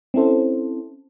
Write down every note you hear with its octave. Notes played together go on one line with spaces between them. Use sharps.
C4 C#4 E4 A4 C5